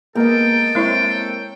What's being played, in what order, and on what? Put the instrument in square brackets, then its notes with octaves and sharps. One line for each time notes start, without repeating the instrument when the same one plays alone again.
[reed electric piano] G#3 B3 A#4 [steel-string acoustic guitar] A#3 D#5 [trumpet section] A4 G5
[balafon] G#3 E4 E5 [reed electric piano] C4 A#4 C#5